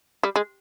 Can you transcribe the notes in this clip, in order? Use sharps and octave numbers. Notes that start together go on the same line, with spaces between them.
G3
G#3